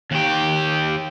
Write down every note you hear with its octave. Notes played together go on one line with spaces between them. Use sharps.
D#2 G4